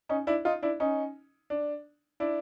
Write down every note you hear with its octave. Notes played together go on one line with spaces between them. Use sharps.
C#4 D#4
D4 E4
D#4 F4
D4 E4
C#4 D#4
D4
D4 E4